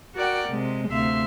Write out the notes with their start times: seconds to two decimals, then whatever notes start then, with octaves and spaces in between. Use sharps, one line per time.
0.15 F#4 A#4 D5 F#5 G5
0.50 C3 G#3
0.89 D2 C3 E5 F5 C6